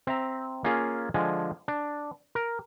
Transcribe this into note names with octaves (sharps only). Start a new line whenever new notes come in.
C4 E5 A#5
A#3 C#4 F4 G#4 F5
D3 F3 G#3 G#5
D4
A#4